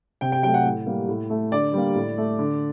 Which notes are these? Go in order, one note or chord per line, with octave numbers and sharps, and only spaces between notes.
C3 G5
G5
F#3 A3 G5
F#5
A2
G3 A#3
A2
A3
D3 D5
G3 A#3
A2
A3
D3